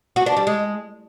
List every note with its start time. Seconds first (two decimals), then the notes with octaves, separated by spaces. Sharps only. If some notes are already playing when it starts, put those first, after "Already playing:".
0.16 F#4
0.26 D4
0.37 G3
0.47 G#3